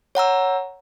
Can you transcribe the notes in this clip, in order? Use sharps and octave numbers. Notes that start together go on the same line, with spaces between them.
C#5 F#5 A#5 E6